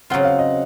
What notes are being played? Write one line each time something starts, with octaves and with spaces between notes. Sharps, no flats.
C#3 F#3 C4 F4 F#5
F5
D#5